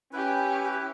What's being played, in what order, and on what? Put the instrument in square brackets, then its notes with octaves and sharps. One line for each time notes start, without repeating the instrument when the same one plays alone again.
[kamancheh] C#4 G4 [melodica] E4 B4